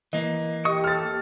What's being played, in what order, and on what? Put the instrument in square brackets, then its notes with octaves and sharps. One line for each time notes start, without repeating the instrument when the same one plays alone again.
[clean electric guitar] E3 A#3 [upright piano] D#5
[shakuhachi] G4 [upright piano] D#5 [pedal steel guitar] C#6 D#6
[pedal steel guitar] A4 [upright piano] F6 A6